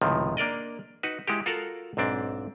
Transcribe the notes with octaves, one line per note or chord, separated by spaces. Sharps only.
C#2 A2 C3 D#3 F3
A#3 D4 A#4 D5 D#5
D#4 F#4 B4
G#3 E4 F#4 G4
F4 F#4 A4 A#4 F5 F#5
B1 G#2 C4 D4